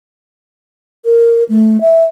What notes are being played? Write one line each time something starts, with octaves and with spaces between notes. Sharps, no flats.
A#4
A3
E5